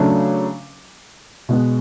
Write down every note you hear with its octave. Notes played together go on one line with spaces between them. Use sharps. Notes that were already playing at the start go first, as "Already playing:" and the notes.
Already playing: C#3 F#3 A3 D4
B2 G#3 B3